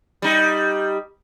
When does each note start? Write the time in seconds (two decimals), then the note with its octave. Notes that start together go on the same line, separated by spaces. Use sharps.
0.22 G3 D#4